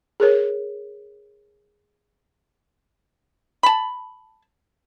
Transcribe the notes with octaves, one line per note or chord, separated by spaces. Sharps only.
G#4 A#4 C#5
A5 B5